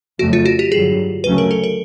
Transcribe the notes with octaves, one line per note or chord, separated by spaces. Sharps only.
F2 C#3 F#3 A3 F#4
F4
F#4
G4
G2 D3 F#3 G#4
D2 C#3 F#3 A3 C#4 B4
A#4
A4
A#4